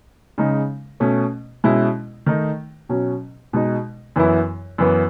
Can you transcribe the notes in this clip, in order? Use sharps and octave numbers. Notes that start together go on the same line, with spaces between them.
C#3 G#3 D#4
B2 A3 C#4
B2 G#3 C#4 E4
D#3 A3 D#4
B2 F#3 C#4
B2 G#3 D#4
F#2 E3 B3 E4
F#2 E3 B3